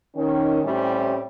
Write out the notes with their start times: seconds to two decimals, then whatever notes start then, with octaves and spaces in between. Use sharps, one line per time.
0.16 D#3 C#4
0.63 A2 G3 C4 C#4 E4 G4